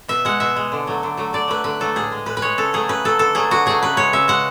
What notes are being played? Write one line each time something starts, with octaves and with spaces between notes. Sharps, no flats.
B2 E5
G#3 F#5
B2 E5
G#3
D3
F#3 A3
D3
F#3 A3
D3 D5
F#3 A3 B4
D3 B4
F#3 A3 A4
A2 G#4
G#3
A2 B4
B4
G#3 C#5
C#3 A4
F#3 A3 G#4
C#3 B4
F#3 A3 A4
D3 A4
F#3 A3 G#4
D3 F#4
F#3 A3 G#4
C#3 B4
G#3 C#5
C#3 E5
G#3 F#5